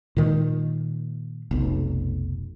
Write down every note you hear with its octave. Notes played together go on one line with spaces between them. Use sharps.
A#2 D#3 G#3
F1 B1